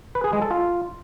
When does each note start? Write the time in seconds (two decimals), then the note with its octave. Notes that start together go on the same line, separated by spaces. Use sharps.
0.15 B4
0.24 G#4
0.33 G#3
0.42 A4
0.51 F4